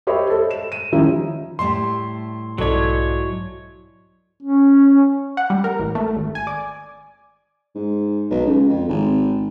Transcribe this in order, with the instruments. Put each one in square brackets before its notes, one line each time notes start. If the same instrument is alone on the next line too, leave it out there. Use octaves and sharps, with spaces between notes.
[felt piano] G4 C5 C#5 D#5 E5 B5
A4
E7
D#7
D#3 F3 G3 C#4 D#4 E4
[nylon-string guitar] A2 G3 A3 [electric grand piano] C6
[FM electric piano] B1 A4 D5 [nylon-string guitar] G#2 E4 [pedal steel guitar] F#3 C#5
[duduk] C#4
[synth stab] F#5
G3
A#4
A1
A3
G#1
G#5
D5
[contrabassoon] G#2
B1
C#2
F2
G#1